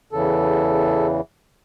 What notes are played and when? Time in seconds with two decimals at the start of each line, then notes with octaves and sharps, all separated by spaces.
0.12 E2 C#3 E3 A4